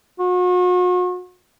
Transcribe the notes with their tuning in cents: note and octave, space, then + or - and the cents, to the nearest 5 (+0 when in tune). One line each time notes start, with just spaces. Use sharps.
F#4 -40